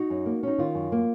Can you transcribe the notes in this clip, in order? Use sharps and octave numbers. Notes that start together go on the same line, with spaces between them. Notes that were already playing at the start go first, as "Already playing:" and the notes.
Already playing: D#4 F#4
F#2
A#3
C#4 D#4
D#3 F4
F#2
A#3